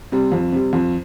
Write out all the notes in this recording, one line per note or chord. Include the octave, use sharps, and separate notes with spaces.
C3 G3
F2
C3 G3
F2